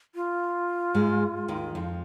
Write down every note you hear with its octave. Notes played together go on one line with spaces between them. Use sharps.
F4
G#2 G#3
D#2 D#3
F2 F3